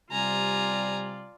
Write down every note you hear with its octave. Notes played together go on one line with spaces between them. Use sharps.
C3 G3 F4 D5 G#5 A#5